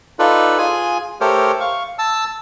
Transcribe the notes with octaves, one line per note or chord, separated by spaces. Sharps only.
D#4 F4 A4 B4 D5
F4 G#4 G#5
A3 G4 A4 A#4 C5 C#5
F5 C#6
A5 E6